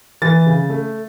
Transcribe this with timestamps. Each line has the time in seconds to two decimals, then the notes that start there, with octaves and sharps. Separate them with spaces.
0.22 E3 A6
0.46 C#3
0.70 A3